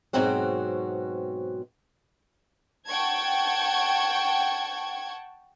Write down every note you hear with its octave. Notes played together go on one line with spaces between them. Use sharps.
G#2 B2 F#3 C4 F#4
F#5 G5 A5 C#6 G#6